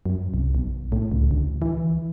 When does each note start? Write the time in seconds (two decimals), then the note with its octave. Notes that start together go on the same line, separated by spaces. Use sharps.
0.06 F#2
0.34 C2
0.55 B1
0.92 A2
1.12 C#2
1.31 D2
1.62 E3